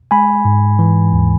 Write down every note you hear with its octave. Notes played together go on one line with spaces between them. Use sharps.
G#3 G#5 B5
G#2
E3
D#2